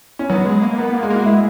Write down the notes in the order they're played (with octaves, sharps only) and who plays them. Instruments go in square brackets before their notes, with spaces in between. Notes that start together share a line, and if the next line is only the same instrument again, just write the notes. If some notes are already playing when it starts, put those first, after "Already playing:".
[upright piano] C#4
[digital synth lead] F#3 [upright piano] B3
[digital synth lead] G#3
A#3
[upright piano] A#3 [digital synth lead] B3
[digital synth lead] A#3
[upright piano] G#3
[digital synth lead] A#3 [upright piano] F#4
[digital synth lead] G#3 [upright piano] E4